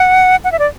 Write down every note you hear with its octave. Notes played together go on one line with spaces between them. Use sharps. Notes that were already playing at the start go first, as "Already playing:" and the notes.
Already playing: F#5
F#5
E5
D5